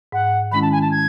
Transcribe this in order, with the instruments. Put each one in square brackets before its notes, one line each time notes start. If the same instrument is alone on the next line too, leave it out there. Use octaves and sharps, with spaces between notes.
[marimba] G#2 [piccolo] F#5
[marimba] D#3 G#3 C#4 E4 [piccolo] B5
[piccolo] A5
G#5
A5
G#6